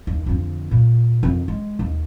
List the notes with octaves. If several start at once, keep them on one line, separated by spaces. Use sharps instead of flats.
D#2
F2 D3
A#2
F2 D#3
G#3
D#2